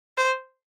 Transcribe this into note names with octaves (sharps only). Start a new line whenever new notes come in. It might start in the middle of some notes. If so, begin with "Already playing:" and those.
C5